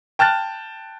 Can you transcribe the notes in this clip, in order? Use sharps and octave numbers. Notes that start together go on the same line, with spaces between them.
G5 A5 F6 F#6 A6